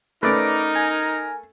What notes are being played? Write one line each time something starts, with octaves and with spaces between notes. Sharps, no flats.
A3 C#4 D#4 A#4 B4 D5 D6
G#5